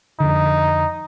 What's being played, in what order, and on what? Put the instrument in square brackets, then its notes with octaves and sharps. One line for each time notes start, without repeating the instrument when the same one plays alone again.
[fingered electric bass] F2 D3 [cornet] D#4